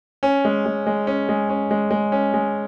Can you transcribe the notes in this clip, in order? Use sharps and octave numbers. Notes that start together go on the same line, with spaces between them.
C#4
G#3
G#3
G#3
C#4
G#3
C#4
G#3
G#3
C#4
G#3